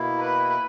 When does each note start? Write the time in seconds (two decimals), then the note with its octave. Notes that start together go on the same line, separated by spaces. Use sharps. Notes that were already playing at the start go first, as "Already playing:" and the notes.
Already playing: B2 A#3 E4
0.21 B4